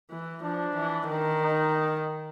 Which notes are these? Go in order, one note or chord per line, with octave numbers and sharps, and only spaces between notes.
E3
F3 D4
E3
D#3
D#4